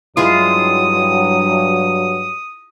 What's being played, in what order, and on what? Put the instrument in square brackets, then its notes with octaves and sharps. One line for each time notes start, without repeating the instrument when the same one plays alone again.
[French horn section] G2 F#3 [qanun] G#3 E4 F4 [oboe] D#6